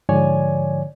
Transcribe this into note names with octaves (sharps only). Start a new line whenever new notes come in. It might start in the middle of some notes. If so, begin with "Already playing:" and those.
G#2 D3 F3 C#5 D5 G#5